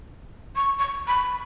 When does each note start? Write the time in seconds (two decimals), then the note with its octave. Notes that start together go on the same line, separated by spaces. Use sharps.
0.56 C#6
0.79 C#6
1.08 B5